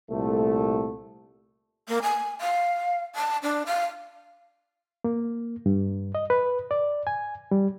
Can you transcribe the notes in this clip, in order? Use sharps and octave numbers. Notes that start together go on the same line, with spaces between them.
C2 A#2 A3
A#3
G#5
F5
A5
D4
F5
A#3
G2
D#5
B4
D5
G#5
G3